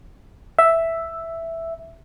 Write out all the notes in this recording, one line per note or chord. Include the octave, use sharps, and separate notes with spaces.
E5